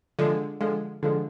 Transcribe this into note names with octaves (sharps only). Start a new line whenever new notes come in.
D3 F3 G#3
D3 F3 G#3
D3 F3 G#3